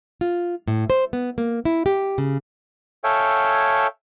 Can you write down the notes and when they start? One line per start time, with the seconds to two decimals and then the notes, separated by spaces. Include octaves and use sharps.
0.21 F4
0.68 A2
0.90 C5
1.13 B3
1.38 A#3
1.65 E4
1.86 G4
2.18 C#3
3.04 A4 C#5 E5 F5 G5 G#5